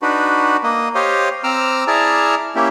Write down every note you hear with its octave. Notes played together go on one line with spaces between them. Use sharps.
D4 D#4 F#4 B4
A#3 D#5
G4 C5 C#5 D#5 F5
C4 A#5 D6 E6 F6
E4 G#4 D5 A5 A#5 F6
A#3 C#4 E4 G4